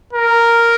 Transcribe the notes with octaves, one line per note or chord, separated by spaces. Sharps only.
A#4